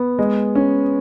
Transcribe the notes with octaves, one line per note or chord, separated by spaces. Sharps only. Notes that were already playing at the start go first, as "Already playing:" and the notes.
Already playing: B3
G#3
C#4